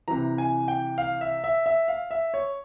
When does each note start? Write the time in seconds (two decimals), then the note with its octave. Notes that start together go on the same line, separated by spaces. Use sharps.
0.08 C3 E3 A#5
0.38 G#5
0.68 G5
0.98 F5
1.21 E5
1.44 E5
1.66 E5
1.88 F5
2.11 E5
2.34 C#5